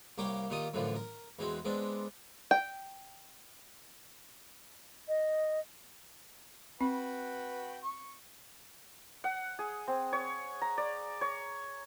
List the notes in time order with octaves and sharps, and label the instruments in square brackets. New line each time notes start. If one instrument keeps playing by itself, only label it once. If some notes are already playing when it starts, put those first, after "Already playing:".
[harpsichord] C2 A#3 A#4 C#5 G5 D6
A#2 D#3 F4 G4 D#6
F#2 A2 D3 E3 F3
A#4
E2 G#3 C4 F#4
G#3 B3 C4 D4
[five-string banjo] G5
[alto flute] D#5
[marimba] C4 [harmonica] F#4 B4 G5
[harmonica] C#6
[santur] F#5
G#4
C4
C#5
A#5
D5
C#5